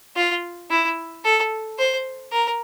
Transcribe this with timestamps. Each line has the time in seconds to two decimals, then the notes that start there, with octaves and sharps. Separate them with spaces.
0.16 F4
0.70 E4
1.25 A4
1.79 C5
2.32 A#4